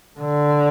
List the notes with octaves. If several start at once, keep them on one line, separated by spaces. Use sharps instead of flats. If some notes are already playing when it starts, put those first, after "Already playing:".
D3